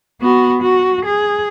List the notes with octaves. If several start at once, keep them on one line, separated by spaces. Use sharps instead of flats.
B3 F#4
F#4
G#4